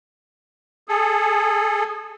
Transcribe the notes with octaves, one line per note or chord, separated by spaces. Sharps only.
G#4 A4